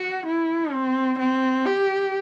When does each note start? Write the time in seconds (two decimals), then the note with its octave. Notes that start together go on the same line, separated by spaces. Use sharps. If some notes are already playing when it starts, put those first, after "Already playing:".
Already playing: F#4
0.26 E4
0.73 C4
1.19 C4
1.66 G4